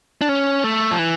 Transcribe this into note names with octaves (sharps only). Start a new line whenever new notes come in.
D4
C#4
A3
F3
E3